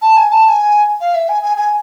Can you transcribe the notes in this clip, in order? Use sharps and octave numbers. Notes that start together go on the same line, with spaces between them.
A5
G#5
A5
A5
G#5
F5
E5
G#5
G#5
G#5